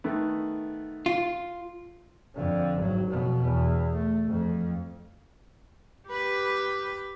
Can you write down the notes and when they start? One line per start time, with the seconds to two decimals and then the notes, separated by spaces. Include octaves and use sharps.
0.04 D#3 A3 B3
1.06 F4
2.36 F2 D3
2.79 G#1 F#3
3.10 F2 B2
3.43 E2
3.93 A3
4.28 F2
6.09 G4 B4